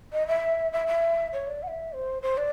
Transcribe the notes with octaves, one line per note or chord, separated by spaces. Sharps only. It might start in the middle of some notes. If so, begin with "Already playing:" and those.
D#5
E5
E5
E5
C#5
D5
F#5
E5
C5
C5
D5